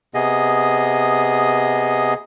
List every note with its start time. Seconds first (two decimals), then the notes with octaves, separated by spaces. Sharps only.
0.14 C3 B3 G#4 D#5